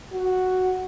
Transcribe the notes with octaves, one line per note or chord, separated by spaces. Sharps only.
F#4